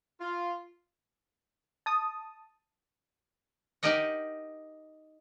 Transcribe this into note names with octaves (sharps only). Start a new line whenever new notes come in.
F4
A5 D#6
D#4 G4 A#4 D#5 F#5